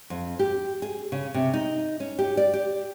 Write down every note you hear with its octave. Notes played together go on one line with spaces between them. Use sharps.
F2
G4
G#4
C#3
C3
D#4
C#4
G4
D5
G4